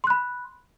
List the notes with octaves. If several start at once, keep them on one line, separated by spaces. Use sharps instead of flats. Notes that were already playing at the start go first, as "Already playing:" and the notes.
B5 C6 F#6